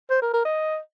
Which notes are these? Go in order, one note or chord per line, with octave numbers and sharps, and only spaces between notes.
C5
A#4
A#4
D#5